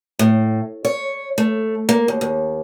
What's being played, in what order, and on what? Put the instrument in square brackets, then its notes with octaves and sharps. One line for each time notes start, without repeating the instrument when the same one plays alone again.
[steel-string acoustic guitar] A2
C#5
A3
A#3
D#2
D#2